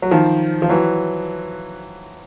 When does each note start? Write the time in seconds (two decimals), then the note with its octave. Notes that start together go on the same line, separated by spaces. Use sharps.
0.02 F#3
0.11 D#3 F3
0.62 F3
0.69 E3 F#3